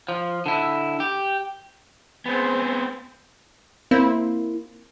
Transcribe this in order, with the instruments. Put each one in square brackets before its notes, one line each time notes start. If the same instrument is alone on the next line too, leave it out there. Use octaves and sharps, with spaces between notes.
[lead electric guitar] F3
D3 E4
G4
[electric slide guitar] B3 C4 [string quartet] G#4 C5
[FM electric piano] A#3 [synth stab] C4 [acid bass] E4